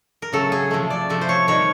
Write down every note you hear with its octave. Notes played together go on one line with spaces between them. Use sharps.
A#4
C#3 F#3 A3 A4
G#4
C3 F3 A3
D5
C3 F3 A3
C5
C#5
C3 D#3 G3 C#5